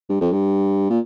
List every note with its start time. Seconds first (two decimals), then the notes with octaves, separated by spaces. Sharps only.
0.09 G2
0.21 F2
0.32 G2
0.90 A#2